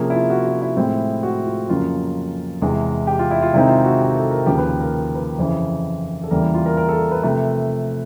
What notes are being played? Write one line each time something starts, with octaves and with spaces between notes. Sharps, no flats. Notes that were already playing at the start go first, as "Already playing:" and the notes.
Already playing: C3 F3 A#3 C#4 G#4
E4
F4
F#4
F#4
E4
A2 F3 G#3 C4
F#4
F4
F2 C#3 F#3 A#3 C#4 F4
E2 C3 E3 G#3
G4
F4
E4
F4
C3 D#3 G#3 C4 D#4 E4
F4
F#4
G4
A4
A#4
D#2 C#3 F3 G4
B4
A#4
A#4
B4
F2 C#3 E3 C5
A4
E2 C#3 E3 G3 A#3 A#4
E4
F4
A#4
A#4
A4
B4
C3 F3 A3